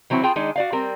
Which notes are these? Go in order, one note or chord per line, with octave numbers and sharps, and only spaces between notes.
E3 F#3 C4 E4 F#4
F4 G#4 G5 A5
D#3 G#3 D4 D#4
F#4 D5 F5
G3 C4 A#4